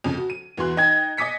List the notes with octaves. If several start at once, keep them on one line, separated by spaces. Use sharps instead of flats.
F2 C#3
F#4
D#7
E2 E3 F#4 C6 F#6
D#4 D#5 G5 G#6
D#5 G#5 D6 D#6 B6 C#7